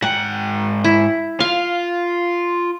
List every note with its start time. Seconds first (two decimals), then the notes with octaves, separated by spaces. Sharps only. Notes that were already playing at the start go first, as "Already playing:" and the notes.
0.02 G#2 F#5 G5
0.84 E4
1.40 F4 F5